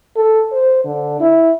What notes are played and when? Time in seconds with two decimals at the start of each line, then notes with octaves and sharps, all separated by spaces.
0.16 A4
0.53 C5
0.85 D3
1.20 E4